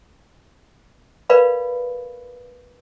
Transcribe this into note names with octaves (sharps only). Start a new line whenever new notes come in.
A#4 B4 D5 F5 B5